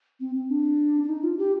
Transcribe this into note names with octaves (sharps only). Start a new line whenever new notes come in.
C4
C4
D4
D4
D#4
F4
G4